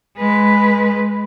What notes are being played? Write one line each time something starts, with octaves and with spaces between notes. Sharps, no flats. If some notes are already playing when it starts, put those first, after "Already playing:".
G#3 B4